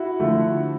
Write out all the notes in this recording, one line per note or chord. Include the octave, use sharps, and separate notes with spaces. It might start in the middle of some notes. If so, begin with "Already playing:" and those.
Already playing: E4 F#4
D3 F3 A3